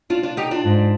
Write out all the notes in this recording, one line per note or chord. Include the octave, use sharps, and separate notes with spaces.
D4 F4
D4 F4
D#4 G4
D4 F4
G#2